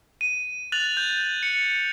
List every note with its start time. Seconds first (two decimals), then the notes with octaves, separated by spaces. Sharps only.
0.21 D#7
0.72 F#6 A6 F7 F#7
0.97 G6
1.43 C#7